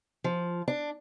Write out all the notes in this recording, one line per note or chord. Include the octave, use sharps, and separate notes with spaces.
F3
D4